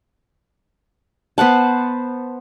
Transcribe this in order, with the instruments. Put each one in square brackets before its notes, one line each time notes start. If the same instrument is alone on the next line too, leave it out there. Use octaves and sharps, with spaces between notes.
[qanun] B3 C5 F#5 A5